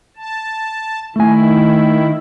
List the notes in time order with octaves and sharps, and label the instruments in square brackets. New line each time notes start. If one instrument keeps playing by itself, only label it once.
[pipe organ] A5
[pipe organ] D#3 E4 [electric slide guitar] A3 G#5